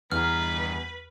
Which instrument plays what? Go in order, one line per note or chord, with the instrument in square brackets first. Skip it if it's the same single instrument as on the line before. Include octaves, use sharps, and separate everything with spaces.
[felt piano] E2 [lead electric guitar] G2 A#5 [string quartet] B4 [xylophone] F6